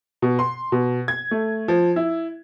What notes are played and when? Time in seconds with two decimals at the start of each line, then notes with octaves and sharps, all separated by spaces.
0.22 B2
0.39 C6
0.72 B2
1.08 G#6
1.31 A3
1.68 F3
1.96 E4